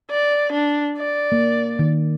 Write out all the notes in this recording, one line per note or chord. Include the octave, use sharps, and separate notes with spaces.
D5
D4
D5
A#3
D#3